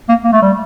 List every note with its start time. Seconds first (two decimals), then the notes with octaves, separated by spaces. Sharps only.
0.09 A#3
0.24 A#3
0.33 A3
0.42 G3